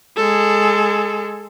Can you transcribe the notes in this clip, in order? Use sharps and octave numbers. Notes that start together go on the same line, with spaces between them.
G#3 A4